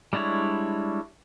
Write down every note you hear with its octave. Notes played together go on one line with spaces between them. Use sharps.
G3 G#3 D4 E4 C#5